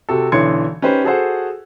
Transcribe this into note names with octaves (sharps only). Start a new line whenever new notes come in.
C3 F#4 A4
B1 D3 E3 C6 G#6 C#7
C#4 D#4 G4 B4 C5
F#4 G#4 A4 C5 F#5